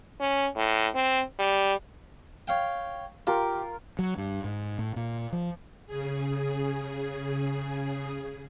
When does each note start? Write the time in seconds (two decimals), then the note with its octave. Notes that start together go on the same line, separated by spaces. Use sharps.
0.20 C#4
0.56 A2
0.95 C4
1.39 G3
2.48 C#5 F5 G5
3.27 F4 G4 A#4
3.99 F#3
4.18 G2
4.44 G#2
4.79 A2
4.96 A#2
5.33 F3
5.87 C#3 G#4